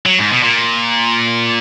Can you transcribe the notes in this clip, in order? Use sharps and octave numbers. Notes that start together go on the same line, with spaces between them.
F#3
G#2
B2
A#2